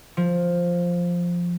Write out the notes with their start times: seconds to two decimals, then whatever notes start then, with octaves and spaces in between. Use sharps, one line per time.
0.17 F3